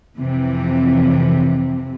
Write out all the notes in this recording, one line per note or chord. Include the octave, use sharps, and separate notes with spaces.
F2 C3 E3